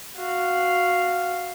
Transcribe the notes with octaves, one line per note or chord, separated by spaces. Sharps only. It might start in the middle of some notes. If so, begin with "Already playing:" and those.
F#4 F5